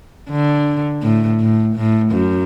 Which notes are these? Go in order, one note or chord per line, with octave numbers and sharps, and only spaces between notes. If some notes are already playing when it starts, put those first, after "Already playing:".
D3
A2
A2
A2
F#2